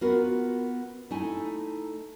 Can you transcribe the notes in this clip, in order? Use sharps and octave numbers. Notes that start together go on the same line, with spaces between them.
B3 F4 F#4 A#4 B4
A3 D#4 E4 G#5